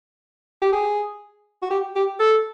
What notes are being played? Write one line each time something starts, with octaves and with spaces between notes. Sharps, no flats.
G4
G#4
F#4
G4
G4
A4